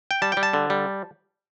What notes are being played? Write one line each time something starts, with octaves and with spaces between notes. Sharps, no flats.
G5
G3 A5
G5
G3
A5
D3
G3